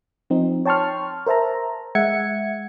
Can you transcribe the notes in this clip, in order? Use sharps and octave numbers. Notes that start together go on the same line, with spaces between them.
F3 C4 D#4
C#5 G5 A5 C6 C#6 F6
A#4 C5 E5 A5 A#5
G#3 E5 F#5 G#6 C#7